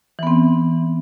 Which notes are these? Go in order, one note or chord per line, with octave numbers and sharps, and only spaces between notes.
E3 B3 C4